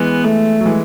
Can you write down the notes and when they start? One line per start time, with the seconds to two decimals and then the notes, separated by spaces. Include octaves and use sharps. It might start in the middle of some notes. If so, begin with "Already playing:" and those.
Already playing: E3 G#3 B3
0.23 A3
0.61 F#3
0.65 E3 G#3